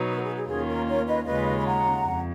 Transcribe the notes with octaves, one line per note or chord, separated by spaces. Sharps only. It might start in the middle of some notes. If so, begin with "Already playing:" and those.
Already playing: B2 F#3 B3 D#4
A#4
G#4
G#4
D#2 D#3 A#3 C#4 F4 G#4
A#4
A#4 C#5
B4 D#5
D#2 C#3 G#3 C#4 F4 B4 D#5
B5
F#5 A#5
F2